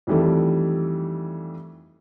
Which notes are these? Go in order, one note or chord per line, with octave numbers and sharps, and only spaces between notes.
F2 D#3 E3 G3 A3